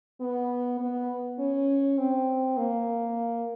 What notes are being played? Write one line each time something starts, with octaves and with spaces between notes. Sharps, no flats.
B3
B3
C#4
C4
A#3